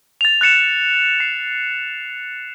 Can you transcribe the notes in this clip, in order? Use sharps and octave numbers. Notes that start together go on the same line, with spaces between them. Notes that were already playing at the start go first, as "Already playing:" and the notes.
A6 F7
F#6 A6 C#7 E7
C7